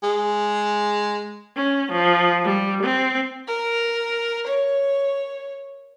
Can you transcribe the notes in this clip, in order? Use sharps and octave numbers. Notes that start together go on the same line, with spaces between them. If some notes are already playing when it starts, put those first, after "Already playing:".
G#3
C#4
F3
G3
C4
A#4
C#5